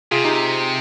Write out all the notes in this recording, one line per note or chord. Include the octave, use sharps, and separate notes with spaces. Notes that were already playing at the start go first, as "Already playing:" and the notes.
C3 F4 G#4
D#4 G4